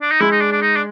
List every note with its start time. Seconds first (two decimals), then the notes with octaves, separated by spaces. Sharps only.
0.02 D4
0.11 D#4
0.20 G#3 E4
0.31 D#4
0.41 D4
0.51 D4
0.61 D#4
0.76 D4